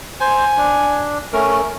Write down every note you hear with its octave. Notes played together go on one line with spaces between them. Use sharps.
C5 G#5
D4
A3 C#4 A#4